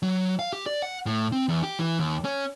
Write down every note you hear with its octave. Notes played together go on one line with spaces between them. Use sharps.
F#3
F5
G4
D5
F#5
A2
C4
E2
G4
E3
D#2
C#4